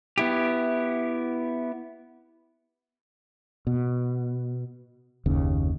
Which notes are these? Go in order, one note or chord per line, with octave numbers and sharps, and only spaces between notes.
B3 E4 G4
B2
F#1 D#2 C#3